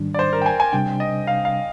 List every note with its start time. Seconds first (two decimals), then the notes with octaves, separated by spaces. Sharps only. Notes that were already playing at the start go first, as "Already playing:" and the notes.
Already playing: G#2 D#3 G3 D4
0.14 D5
0.19 C5
0.33 A#4
0.42 G5
0.46 G#5
0.60 G#5
0.73 C3 G3 D4 G5
1.00 D#5
1.27 F5
1.45 F5